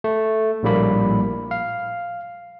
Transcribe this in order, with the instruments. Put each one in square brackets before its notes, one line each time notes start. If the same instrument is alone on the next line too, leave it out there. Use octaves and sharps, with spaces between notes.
[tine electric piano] A3
A#1 A2 G3 A#3 B5
F5